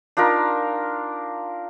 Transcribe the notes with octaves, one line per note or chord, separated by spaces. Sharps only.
D4 D#4 F4 A#4